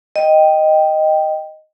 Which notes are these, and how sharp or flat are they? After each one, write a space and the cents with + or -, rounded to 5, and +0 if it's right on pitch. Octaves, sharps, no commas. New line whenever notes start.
D#5 +0 G5 +0